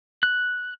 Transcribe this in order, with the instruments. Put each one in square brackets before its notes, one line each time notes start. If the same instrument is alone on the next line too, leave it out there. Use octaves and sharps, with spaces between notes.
[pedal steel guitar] F#6